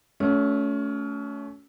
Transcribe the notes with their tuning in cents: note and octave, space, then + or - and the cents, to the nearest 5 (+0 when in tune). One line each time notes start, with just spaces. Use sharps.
A3 -10 C#4 +25 F#4 +0